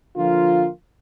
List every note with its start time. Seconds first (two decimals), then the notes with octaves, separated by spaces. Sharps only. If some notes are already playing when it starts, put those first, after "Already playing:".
0.16 D3 F3 A#3 F4